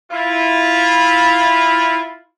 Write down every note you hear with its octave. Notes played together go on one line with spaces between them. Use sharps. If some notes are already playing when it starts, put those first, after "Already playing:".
E4 F4